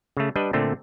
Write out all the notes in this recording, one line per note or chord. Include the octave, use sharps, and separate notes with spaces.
C#3 A3
G3 D4 B4 D#5
A#2 D3 A3 C4